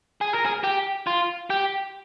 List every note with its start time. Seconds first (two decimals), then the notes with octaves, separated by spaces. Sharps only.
0.21 G#4
0.33 A#4
0.45 G#4
0.64 G4
1.07 F4
1.50 G4